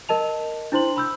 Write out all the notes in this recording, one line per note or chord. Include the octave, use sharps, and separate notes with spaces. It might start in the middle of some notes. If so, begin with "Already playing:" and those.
A#4 D#5 A5 F7
D4 E4 C5 C6 F#7
B5 E6 G6